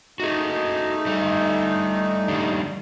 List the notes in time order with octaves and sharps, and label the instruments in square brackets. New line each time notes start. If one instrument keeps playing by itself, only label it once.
[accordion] A3 D#4 [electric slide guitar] F#4 G#4
[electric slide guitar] G3 A4
D#3 G3 D4